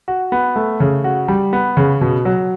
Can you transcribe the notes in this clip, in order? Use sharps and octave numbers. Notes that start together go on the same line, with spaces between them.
F#4
B3
A3
C#3
F#4
G3
B3
C#3
B2
F#3